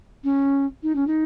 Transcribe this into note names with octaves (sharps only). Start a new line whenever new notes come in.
C#4
D#4
C#4
D#4